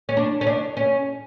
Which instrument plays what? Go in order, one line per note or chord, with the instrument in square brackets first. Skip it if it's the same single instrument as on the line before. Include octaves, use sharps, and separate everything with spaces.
[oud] C#4
D4
C#4
D4
C#4